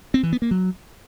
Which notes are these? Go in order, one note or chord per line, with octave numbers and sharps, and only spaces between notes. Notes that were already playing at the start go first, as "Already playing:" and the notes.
C4
E3
B3
A#3
F#3